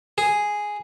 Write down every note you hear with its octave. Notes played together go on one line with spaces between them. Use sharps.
G#4